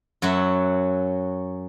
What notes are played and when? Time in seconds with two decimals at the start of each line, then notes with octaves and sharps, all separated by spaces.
0.22 F#2 F#3 F#4 E5